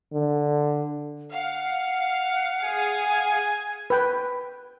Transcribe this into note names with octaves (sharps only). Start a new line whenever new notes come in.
D3
F5 F#5
G#4 G#5
B4 G5